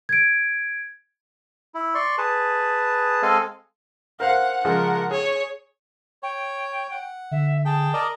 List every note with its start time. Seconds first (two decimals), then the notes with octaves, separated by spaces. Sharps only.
0.09 G#6 D7
1.74 E4
1.95 D5 C6 C#6
2.18 G#4 B4 A5
3.23 G#3 C4 A4 D#5 F5 G#5
4.20 A#4 C5 F5 F#5
4.65 C#3 F3 G#3 A#4 F#5
5.11 G#4 C#5
6.23 C#5 G5
6.92 F#5
7.31 D3 E5
7.65 G#4 G5 A5
7.94 A#4 D5 D#5